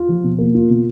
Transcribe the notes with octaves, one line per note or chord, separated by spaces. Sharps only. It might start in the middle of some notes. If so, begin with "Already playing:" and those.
Already playing: F4
F3
B2
A#3
F4
B2